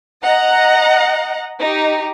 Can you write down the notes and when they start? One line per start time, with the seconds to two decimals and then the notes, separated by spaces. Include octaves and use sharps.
0.23 D#5 F#5 A#5
1.58 D#4 G4